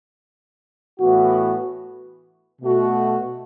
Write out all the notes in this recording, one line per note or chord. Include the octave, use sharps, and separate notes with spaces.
A2 E3 B3 F#4
B2 A3 F#4